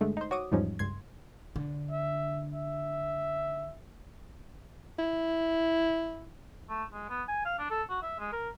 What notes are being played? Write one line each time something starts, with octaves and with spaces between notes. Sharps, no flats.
G2 D3 G#3 A3
D#4 C5
F#4 C#5 D6 D#6
E2 G#2 F3 G3 C#4 D#4
C#2 G2 C6 G#6
D3
E5
E5
E4
A3
G#3
B3
G#5
F5
D4
A4
F#4
E5
G#3
A#4